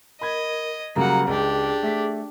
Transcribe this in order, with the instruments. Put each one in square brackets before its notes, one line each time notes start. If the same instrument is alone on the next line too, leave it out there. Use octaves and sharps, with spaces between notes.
[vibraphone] A#4 [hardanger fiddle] D#5 [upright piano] B5 G#6
[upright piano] C#3 F#3 G3 [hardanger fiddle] A#3 F#5 [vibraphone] F5 A#5
[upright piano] C#2 [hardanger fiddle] D4 G4 [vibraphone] G#4
[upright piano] A3 B6